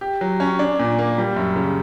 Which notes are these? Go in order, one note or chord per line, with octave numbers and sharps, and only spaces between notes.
G4
F#3
C#4
D4
A#2
A#3
G3
F#2
C#3